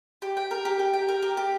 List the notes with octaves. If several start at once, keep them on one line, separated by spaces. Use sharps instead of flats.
G4
G5
A#4
G4
G4
G5
A#4
G4
G4